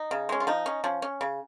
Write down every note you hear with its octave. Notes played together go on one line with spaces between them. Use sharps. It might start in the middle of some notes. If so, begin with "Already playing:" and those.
Already playing: D#4
C#3
G#3 C#4
F4
F3 D#4
C#4
F3 C#4
C#4
C#3